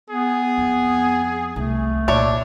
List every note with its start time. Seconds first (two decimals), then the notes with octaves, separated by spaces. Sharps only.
0.10 B3 G#4
0.58 F2
1.56 C2 A3
2.08 A#2 D4 C#5 E5